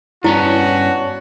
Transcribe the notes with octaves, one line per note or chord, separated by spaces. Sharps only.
G2 B3 C#4 E4 F#4 C#5 D5 A5